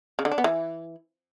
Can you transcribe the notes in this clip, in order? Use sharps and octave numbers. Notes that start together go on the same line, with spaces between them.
C#3
D3
D4
B3
E3